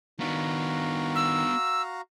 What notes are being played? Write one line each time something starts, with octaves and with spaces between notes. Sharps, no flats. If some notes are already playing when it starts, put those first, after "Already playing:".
D#3 B3 D4 F#4 F5 A#5
E6